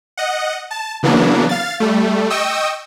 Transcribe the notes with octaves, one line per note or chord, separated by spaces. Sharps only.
D#5 F#5
A5
C#3 E3 F#3 A#3 B3 D4
F5 A6
G3 A3
D#5 G5 C#6 D#6 E6